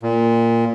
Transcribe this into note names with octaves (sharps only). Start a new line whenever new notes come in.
A#2